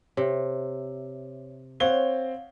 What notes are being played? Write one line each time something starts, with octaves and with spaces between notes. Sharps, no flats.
C3 C#5 E5
C4 C#5 F5 F#5 G7